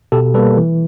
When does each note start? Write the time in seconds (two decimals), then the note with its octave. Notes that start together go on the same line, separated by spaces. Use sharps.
0.12 B2 G4 A4
0.34 G3 A#3 A4 B4
0.57 E3